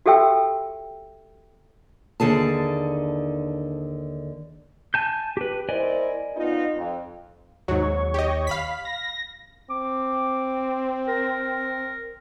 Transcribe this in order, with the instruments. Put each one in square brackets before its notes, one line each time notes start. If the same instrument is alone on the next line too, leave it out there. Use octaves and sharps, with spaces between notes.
[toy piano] F#4 G4 A4 E5 G5 E6
[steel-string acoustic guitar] D#2 D3 G#4 A5
[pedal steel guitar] G#5 A5 G6
G4 B4
[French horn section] E4 A#4 C5 [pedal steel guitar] D5 D#5 G#5
[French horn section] B3 D#4 F4
F2
[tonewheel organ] D#2 C#5 [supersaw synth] G#2 F#3
[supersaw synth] G4 D#5
F5 B5 B6
[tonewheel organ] A#6
[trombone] C4 [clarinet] D6
[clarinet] A#4